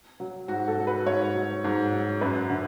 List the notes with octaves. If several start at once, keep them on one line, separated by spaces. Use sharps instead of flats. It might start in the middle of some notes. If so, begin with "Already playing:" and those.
F#3
G#2 F#4
A4
F#3
B4
G#2 C#5
F#3
G#2
F#3
F#2 B4
D3